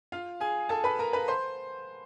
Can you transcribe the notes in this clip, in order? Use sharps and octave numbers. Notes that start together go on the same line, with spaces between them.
F4 F5
G#4 G#5
A4 A5
B4 B5
A#4 A#5
B4 B5
C5 C6